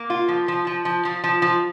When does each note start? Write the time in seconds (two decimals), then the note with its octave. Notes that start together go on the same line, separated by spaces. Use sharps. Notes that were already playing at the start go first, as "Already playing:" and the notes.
Already playing: A#3
0.10 F4
0.28 F3
0.48 F3
0.67 F3
0.85 F3
1.05 F3
1.24 F3
1.42 F3